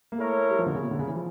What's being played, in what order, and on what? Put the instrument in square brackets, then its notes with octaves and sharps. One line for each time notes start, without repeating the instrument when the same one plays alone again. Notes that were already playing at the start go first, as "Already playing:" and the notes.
[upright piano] A#3
[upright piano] A3 [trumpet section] E4 A#4 C#5
[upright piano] G3
F3
D3
C#3
A#2
D3
C#3
E3
F3